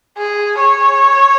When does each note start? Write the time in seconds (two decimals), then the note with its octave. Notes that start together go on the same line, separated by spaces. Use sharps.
0.18 G#4
0.59 C#5